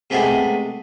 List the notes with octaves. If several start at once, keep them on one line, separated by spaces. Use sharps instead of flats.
C3 G#3 A3 B3 G#4